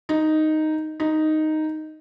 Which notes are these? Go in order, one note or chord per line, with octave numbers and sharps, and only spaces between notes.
D#4
D#4